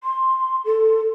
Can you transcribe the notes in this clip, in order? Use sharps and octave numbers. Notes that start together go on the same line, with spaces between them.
C6
A4